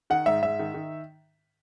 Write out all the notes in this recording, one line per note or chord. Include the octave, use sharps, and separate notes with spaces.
D#3 F#5
G#2 E5
G#2 E5
D#3
D#3